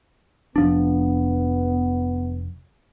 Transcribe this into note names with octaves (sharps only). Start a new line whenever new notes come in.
F1 F3 B3 D4